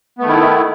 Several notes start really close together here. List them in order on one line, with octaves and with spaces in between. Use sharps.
B3 A3 D#3 E4